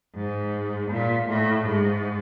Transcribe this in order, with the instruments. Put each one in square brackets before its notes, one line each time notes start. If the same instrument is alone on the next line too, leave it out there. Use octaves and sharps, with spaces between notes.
[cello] G#2
A#2
A2
G#2